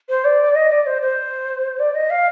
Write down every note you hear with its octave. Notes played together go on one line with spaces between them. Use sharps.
C5
D5
D#5
D5
C5
C5
D5
D#5
F5